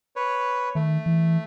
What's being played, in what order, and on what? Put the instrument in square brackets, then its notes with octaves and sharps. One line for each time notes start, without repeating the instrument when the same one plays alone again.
[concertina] B4 C#5
[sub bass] D#3 [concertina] A3
[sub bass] E3